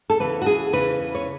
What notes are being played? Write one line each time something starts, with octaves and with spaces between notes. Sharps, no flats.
A4
E2 C#3 E3 B4
F#4
G#4
E2 C#3 E3 B4
C#5